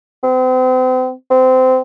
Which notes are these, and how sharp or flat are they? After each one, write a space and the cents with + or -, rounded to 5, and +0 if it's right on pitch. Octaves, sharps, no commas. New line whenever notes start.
C4 -40
C4 -20